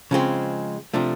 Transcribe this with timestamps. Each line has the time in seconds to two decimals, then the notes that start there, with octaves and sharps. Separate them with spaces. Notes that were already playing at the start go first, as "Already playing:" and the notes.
0.11 C#3 F3 G#3 C4
0.94 C3 F3 A3 D4